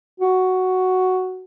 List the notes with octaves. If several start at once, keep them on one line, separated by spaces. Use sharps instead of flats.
F#4